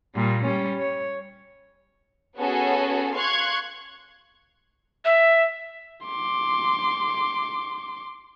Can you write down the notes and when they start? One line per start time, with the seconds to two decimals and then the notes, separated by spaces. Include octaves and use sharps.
0.15 A#2 G3
0.44 G3 C#4
0.79 C#5
2.37 B3 C#4 F#4 G#4 A4
3.14 F5 C6 C#6 F#6 G#6
5.05 E5
6.05 C6 D6